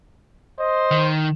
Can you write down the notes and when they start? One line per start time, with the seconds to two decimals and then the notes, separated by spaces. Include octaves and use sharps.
0.59 C5 D#5
0.91 D#3